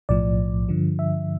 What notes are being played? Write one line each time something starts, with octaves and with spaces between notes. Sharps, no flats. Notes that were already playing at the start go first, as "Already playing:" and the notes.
B1 A2 F3 D5
G2 D3 F3
E5